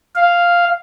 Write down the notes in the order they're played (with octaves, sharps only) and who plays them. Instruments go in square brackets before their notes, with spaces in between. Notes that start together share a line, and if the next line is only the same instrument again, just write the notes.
[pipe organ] F5